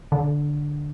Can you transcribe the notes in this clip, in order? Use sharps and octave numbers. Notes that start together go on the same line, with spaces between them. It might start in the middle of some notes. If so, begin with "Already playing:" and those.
D3